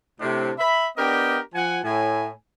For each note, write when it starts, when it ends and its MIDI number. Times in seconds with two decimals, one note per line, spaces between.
0.20 0.51 45
0.20 0.51 48
0.20 0.51 62
0.58 0.87 76
0.58 0.87 83
0.96 1.38 59
0.96 1.38 62
0.96 1.38 67
0.96 1.38 70
0.96 1.38 75
0.96 1.38 79
1.54 1.78 53
1.54 1.78 78
1.54 1.78 80
1.84 2.29 45
1.84 2.29 80